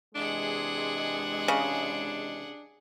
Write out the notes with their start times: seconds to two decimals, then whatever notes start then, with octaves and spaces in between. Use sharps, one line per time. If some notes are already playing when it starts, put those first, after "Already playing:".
0.15 C3 E3 G#3 D4 G#4 F#5
1.48 C#3